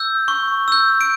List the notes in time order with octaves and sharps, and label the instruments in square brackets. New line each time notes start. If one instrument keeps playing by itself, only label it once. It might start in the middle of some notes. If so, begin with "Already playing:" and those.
Already playing: [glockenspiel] E6 G6
C#6
E6 G6
D7